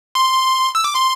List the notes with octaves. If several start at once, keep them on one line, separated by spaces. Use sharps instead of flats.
C6
E6
D6
C6